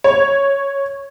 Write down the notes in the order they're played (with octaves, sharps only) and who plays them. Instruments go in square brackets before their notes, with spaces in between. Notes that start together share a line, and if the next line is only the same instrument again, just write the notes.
[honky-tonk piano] C#5